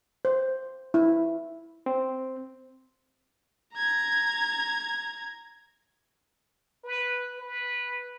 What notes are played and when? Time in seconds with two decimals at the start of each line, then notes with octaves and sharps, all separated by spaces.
0.25 C5
0.94 E4
1.86 C4
3.75 A#5 G#6
6.84 B4
7.39 B4